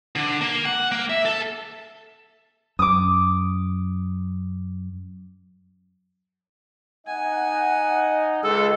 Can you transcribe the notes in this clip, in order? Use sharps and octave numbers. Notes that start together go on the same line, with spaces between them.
D3
A#3
F#5
A#3
E5
A4
F#2 D6 D#6
D#4 D#5 F#5 G#5
C#2 G#3 A4